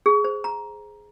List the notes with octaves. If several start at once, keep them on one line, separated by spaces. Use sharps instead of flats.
G#4
C5
A#5